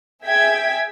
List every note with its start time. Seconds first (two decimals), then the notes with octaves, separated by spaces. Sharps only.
0.24 G#4 E5 G5 G#6 B6